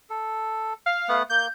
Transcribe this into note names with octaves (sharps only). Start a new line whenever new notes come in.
A4
F5
A3 B3 F#5
A#3 G6